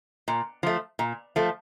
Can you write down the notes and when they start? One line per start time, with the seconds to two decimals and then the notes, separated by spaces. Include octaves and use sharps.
0.28 A#2
0.63 F3 A3
0.99 A#2
1.36 F3 A3